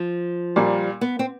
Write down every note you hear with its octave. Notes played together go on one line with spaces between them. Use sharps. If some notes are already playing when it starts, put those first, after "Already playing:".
Already playing: F3
A#2 G3 A#3
B3
C4